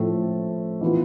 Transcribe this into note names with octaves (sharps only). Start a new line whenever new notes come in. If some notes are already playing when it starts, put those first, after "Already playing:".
Already playing: A2 F3 A3
E3 B3 F4